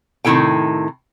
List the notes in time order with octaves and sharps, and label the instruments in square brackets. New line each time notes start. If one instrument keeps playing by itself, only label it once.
[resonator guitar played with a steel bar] A2 C3 D#3 E4 A4 G5